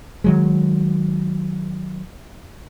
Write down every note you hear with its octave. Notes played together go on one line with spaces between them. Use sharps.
D#3 F#3 G#3